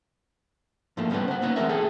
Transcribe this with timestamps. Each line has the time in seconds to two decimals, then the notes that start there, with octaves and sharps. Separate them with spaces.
0.97 G#2 F3 A3 A#3
1.10 C#2 G3 B3 C#4 B4 F#5
1.28 C5 F#5
1.42 A#3 B3 C#4 D#4 F#5
1.56 E3 A3 A#3 C4 A#4 E5
1.69 G#4 A4 G5